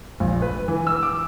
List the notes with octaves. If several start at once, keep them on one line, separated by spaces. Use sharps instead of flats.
A#1
B4
E3
E6
D6